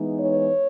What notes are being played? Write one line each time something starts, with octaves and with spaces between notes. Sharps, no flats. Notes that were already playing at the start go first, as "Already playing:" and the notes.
Already playing: E3 G#3 B3 D#4
C#5